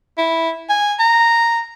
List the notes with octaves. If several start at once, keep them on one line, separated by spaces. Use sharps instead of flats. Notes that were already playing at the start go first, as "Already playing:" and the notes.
E4
G#5
A#5